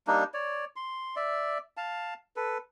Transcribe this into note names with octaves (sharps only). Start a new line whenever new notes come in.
G3 A#3 D4 D#4
C#5 D5
C6
D5 E5
F5 A5
A4 B4